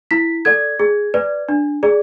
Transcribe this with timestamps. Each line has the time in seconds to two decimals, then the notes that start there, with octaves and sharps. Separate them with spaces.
0.11 E4 B6
0.45 A4 D5 G#6
0.79 G#4
1.14 B4 D5
1.49 D4
1.83 G#4 D5